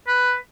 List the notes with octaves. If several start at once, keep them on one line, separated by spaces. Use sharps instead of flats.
B4